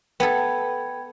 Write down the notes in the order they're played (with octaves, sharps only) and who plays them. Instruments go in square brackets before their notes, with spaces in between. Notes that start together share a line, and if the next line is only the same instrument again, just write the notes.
[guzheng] B3 A4 [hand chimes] G5 B5 G#6